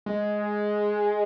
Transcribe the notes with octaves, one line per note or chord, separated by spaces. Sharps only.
G#3